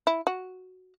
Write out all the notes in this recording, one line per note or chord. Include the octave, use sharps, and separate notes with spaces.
E4
F#4